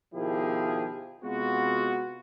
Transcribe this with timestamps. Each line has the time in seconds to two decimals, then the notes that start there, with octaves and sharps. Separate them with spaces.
0.14 B2 D#3 F3 E4 G4 G#4
1.24 C3 G#3 B3 F4 F#4